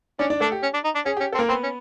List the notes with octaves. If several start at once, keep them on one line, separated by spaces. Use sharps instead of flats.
C#4 D4 D5
D4 D5
A3 D4 A4
G4
C#4
D4
D#4
D4
C#4 G#4
C#4 G4
C4 A4
A#3 A#4
B3 C4 B4
C#4